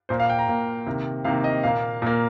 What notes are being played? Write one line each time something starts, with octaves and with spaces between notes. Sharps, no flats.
A#2 A#3 C5
F5
G5
A#5
A#2 A#3
C3 D#3 A#3
C3 D#3 A#3 F5
D#5
A#2 A#3 F5
A#2 A#3